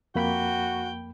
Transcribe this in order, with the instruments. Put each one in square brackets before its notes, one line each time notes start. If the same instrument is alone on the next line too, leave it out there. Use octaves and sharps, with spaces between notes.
[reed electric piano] F2 A#3 B5 [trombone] F#4 [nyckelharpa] G5